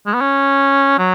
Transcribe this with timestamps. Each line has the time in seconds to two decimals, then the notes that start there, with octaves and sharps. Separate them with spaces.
0.06 G#3
0.14 B3
0.21 C#4
0.99 F#3